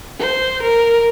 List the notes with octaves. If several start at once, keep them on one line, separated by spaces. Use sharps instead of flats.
C5
A#4